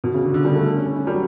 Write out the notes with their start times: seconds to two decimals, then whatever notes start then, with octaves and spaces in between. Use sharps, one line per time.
0.04 B2
0.14 C#3
0.24 D3
0.34 D3
0.45 G3
0.55 A3
0.75 C#4
0.86 C#4
0.96 C#4
1.07 G3
1.12 F#3